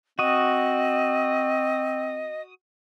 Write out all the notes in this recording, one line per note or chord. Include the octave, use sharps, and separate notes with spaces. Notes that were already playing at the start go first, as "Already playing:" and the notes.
C4 F#4 D#5 D#6